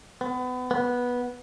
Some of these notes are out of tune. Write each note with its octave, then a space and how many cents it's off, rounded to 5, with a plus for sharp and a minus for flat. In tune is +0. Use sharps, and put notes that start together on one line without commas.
B3 +30
B3 -10